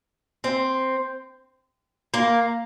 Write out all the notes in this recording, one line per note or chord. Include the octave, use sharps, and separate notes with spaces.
C4
A#3